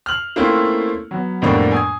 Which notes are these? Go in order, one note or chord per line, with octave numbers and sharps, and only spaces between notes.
F6 F#7
A3 A#3 C4 C#4 E4 F4
F#3 B3
F2 A2 G3 A#3 B3 D4
G#5 D#6 G#6